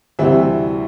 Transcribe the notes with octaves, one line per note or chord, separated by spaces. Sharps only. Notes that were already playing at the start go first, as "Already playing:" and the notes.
D2 C3 E3 G3 C4 E4 E5